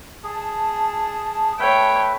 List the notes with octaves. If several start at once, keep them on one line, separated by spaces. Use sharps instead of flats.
G#4 A5
A3 B4 C#5 E5 G5